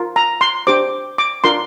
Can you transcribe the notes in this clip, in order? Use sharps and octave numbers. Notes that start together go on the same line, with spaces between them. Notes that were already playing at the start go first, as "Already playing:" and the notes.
Already playing: F4 A#4
A#5
C6
D4 G4 C5 D6
D6
D4 F4 A#4 C6